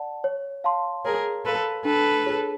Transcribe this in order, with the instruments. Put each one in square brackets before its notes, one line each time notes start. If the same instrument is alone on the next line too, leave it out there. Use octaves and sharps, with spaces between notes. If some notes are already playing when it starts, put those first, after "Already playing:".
Already playing: [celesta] D5 F#5 A5
C#5
F5 A5 C6
[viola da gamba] G#4 A#4 [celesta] C#5
[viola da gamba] A4 B4 [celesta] F5 A5 C6
[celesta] D4 [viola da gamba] A4 B4
[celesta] F4 G#4 C#5